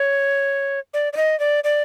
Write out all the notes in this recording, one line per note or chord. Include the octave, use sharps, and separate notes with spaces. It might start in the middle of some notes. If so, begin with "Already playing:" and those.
Already playing: C#5
D5
D5
D#5
D5
D5